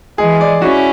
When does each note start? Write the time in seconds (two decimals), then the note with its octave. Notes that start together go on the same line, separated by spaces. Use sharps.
0.18 E3 G#3 G#4
0.41 D5
0.62 C#4 E4 F#4